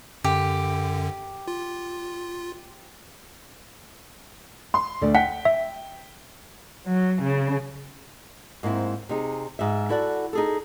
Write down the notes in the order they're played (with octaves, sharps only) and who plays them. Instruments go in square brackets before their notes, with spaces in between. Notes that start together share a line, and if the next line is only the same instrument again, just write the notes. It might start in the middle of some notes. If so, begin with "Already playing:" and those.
[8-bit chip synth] F#2 D3 [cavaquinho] G4
[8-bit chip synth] F4
[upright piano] C6
D2 A3 D5
[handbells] F#5 [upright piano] G5 B6
[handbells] E5
[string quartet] F#3
C#3
[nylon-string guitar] G#2 A#3 C4 E4
C3 D#4 G#4
G#2 E5
E4 F#4 A4 D5 F#5
D#4 G#4 A4